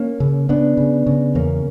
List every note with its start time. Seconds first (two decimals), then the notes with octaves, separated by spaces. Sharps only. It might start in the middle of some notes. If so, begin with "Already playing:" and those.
Already playing: A#3 C#4
0.20 C#3
0.49 C#3 B3 D4
0.77 C#3
1.07 C#3
1.35 E2 A#3 C#4